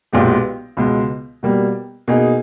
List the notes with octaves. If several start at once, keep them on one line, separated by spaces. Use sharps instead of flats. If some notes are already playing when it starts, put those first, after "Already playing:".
B1 A#2 G#3 B3 G4
C#2 B2 G#3
B2 G3 A#3
B2 A#3 D#4 G#4